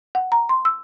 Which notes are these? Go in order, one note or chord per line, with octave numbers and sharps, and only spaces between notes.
F#5
A#5
C6
E6